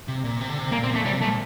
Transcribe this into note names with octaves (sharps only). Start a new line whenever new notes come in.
C3
A#2
C3
D3
C3
A#2 A#3
C4
A#2
A3
C3 G3
A#2 A3